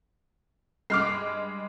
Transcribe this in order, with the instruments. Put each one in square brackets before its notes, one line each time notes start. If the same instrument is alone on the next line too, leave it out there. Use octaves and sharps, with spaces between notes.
[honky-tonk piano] G2 G#3 [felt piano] D6 F6 C7